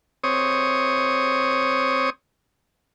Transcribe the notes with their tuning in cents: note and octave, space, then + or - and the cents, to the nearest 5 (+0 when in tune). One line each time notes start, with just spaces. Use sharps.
C4 +0 C#5 +0 D#6 +0